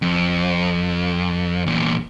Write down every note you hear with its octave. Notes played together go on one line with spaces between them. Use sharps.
F2
E2 A#2